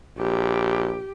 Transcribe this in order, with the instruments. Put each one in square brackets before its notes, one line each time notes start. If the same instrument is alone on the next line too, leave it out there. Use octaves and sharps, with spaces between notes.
[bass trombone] A#1 [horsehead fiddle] G4